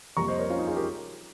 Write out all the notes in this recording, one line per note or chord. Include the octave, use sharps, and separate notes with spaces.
F2 C3 G3 A#3 A#5 C#6
C5 D#5
A#4 C#5
C#4 F4
D#4
F4 G#4
G4 A#4